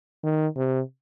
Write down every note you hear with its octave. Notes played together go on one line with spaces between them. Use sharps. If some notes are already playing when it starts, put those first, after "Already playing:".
D#3
C3